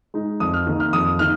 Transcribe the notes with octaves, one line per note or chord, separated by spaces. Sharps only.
G#3 D#4
F2 D#6
F6
D#3 A#3 D#4
F6
F2 D#6
D#3 A#3 D#4 F6